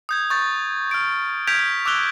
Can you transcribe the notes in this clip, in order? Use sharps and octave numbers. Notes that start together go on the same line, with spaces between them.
D#6 G6 G#6
C#6 G6 A6
F6 D7
F6 G6 G#6 B6 D7 F7
D6 E6 F#6 F7 G7